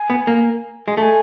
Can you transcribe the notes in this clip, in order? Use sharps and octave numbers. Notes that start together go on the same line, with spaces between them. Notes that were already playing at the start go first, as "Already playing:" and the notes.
Already playing: G#5
B3
A#3
G#3
A3 A5
G#5